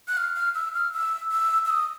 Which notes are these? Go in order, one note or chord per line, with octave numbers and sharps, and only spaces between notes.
F#6
F6
F6
E6
F6
E6
E6
E6
D#6